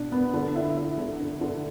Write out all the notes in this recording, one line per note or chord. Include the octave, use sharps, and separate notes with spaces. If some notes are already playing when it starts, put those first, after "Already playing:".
Already playing: B2 D4
B3
D3
E4
E4
D3
D3
D3